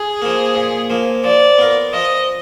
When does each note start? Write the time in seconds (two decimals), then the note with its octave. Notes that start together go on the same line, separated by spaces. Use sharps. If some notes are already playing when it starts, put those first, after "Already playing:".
Already playing: G#4
0.22 F3 A#3
0.55 A#2
0.90 F3 A#3
1.24 F3 D5
1.58 B3 F4 A#4
1.93 F3 D#5